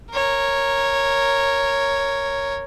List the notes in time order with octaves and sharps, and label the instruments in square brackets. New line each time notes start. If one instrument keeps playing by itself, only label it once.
[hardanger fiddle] A#4 C#5